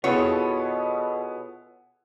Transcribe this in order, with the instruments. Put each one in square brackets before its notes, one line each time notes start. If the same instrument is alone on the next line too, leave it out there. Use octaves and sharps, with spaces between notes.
[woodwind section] B2 [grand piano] B3 E4 G#4 [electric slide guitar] F4 A4 A5 [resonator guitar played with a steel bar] C#5